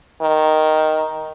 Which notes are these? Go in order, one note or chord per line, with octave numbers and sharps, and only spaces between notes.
D#3